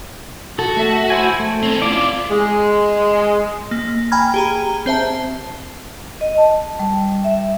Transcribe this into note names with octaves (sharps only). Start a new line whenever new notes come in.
F#4 A4
A3 E5
E4 C5 G#5
A3
C4 C#4
E4 F4 D5 D6
G#3
A#3
G5 G#5 A#5 B5 F6 G#6
G4 G#4 A#5
C4 C5 E5 A5
D#5
A5
G3
E5